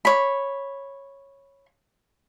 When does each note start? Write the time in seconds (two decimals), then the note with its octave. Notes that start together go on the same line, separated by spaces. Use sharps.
0.05 C#5 B5